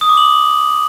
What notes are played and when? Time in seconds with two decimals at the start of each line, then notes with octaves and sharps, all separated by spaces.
0.01 D#6
0.09 D6
0.17 F#7